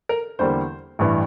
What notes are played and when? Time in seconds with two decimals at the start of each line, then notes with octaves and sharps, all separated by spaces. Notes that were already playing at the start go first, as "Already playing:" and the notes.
0.09 A#4
0.39 E2 D3 G3 A#3 C5
0.99 A1 G2 E3